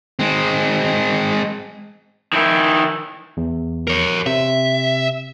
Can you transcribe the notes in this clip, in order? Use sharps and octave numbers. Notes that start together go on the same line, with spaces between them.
G#3 C4
D#3 E4
E2
A#4 C#5
C3 E5